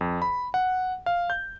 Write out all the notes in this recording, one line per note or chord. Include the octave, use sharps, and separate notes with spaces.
F2
B5
F#5
F5
G6